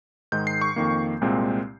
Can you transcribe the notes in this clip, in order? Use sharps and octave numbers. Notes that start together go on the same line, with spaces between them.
G#2 D#3 G#3 G6
C7
C#6
F2 D#3 A#3
C2 A#2 G#3 C4